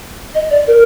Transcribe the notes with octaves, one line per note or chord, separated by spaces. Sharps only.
D#5
D5
A#4